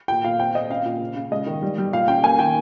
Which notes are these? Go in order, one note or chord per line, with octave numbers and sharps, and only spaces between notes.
A#2 G5
A#2 F5
C4 G5
C4 D#5
C#4 F5
A#2
C#3
C#3
G#3 D#5
D#3
G3
G3
A#2 F5
C#4 G5
A#3 G#5
D#3 G5